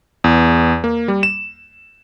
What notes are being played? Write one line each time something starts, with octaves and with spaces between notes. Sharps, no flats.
E2
A#3
G3
E7